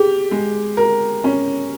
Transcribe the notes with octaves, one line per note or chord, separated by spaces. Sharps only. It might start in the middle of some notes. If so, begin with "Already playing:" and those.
Already playing: G4 G#4
G#3
A#4
C#4